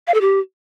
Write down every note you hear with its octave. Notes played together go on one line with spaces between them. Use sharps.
F5
A4
G4